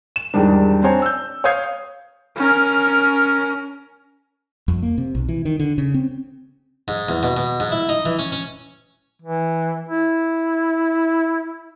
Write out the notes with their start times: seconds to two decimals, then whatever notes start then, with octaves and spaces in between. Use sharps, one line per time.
0.16 E7
0.34 E2 G#2 D#3 G3 D4
0.83 C4 D4 C5 C#5 G#5 A#5
1.02 E6 G6
1.44 C#5 F5 D#6 G6 G#6 C7
2.36 C#4 A#4
4.68 F2
4.82 A#3
4.98 C3
5.15 B1
5.29 E3
5.45 D#3
5.60 D3
5.78 C#3
5.94 C4
6.88 G#2
7.09 E2
7.23 B2
7.37 B2
7.60 G#2
7.72 E4
7.89 D#4
8.06 E3
8.19 C#4
8.32 C#4
9.22 E3
9.89 E4